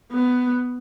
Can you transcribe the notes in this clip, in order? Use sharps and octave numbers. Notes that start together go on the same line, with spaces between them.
B3